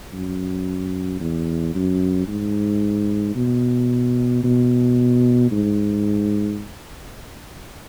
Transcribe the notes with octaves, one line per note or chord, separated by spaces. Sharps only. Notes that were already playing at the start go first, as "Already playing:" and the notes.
F#2
E2
F#2
G#2
B2
B2
G#2